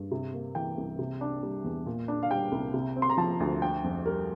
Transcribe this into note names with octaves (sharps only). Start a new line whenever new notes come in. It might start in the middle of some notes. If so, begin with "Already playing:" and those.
Already playing: G2
C3
A#3
E3 G5
C2
C3
D4
G3
E2
A#2
D4
F5
G3 G5
C2
C3
C4
C6
A#5
F3 A5
D2
D3 G5
F2
G3 A#4